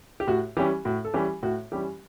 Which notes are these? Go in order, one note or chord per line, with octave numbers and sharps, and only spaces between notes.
G4
A2 F#4
E3 G3 C#4 G4
A2 F#4
A4
E3 G3 C#4 G4
A2 F#4
E3 G3 C#4 G4